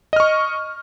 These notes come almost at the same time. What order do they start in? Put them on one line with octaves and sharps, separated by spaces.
D#5 F6 C#6